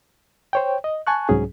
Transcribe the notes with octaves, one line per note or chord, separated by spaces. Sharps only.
C5 C#5 G5
D#5
G#5 A5 C#6 F#6
C2 G#2 F#3 C#4 G#4